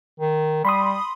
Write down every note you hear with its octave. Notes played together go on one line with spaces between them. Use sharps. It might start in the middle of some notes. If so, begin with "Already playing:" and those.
D#3
G3 B5 C6 D#6